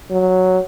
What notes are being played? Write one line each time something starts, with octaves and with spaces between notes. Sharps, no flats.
F#3